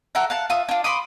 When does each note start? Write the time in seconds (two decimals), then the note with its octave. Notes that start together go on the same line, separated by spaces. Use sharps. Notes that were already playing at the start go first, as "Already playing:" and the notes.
0.15 F#4 A4 A#4 E5
0.30 F5 F#5 A5
0.50 F4 E5 D#6
0.69 D4 F4
0.84 B5 C6 D6 D#6